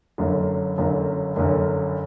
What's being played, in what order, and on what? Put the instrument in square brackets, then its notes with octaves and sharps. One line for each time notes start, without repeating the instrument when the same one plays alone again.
[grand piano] F#1 F#2 D3
F#1 F#2 D3
F#1 F#2 D3